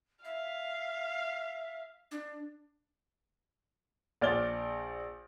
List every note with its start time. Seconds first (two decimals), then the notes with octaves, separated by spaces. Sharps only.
0.25 E5 F5
2.11 D4
4.21 A#1 D5 F6 A6 G7